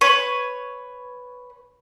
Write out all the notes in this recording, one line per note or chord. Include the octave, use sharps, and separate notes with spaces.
B4 C#5